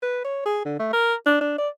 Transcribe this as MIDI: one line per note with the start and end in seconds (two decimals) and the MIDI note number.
0.03 0.21 71
0.25 0.43 73
0.46 0.61 68
0.65 0.75 50
0.80 0.90 57
0.93 1.14 70
1.26 1.39 62
1.41 1.54 62
1.58 1.69 74